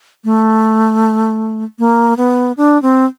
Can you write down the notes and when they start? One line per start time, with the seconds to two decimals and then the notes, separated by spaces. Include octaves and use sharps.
0.24 A3
1.79 A#3
2.17 B3
2.57 D4
2.82 C4